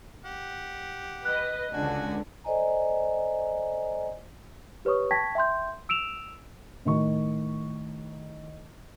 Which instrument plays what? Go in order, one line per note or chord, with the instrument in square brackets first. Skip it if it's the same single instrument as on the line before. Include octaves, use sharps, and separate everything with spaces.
[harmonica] G4 F#5
[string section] B4 D#5 [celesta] F#6
[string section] C#2 D3 [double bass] D4 [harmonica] F#4 G#5
[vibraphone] A4 C5 D5 D#5 G#5 A#5
[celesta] G4 B4 C#5 C#6 D#6
G5 A5 C#6 G#6 A#6 B6
E5 G5 C6 G6
E6 D7 E7 F7
[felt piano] A2 D#3 C#6